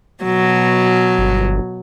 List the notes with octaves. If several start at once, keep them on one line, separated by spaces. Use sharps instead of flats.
B2 F#3
G1